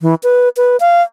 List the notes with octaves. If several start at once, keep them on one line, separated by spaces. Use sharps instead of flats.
E3
B4
B4
F5